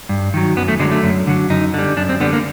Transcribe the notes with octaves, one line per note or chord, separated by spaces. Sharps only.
G2
D#3 F#3
F#2 B3
A3
D3 F#3 G#3
A3
F#2
D3 F#3
F#2 D#4
D3 G3
F#2 D4
C4
D3 G3 B3
A#3